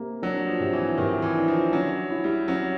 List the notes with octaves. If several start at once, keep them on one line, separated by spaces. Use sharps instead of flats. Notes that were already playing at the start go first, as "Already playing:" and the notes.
Already playing: C3 A#3
F#3 D4
F3
C3
E3
C3 D#3
E3
D4
F3
F#3 C#4
E4
G3
F#3 C#4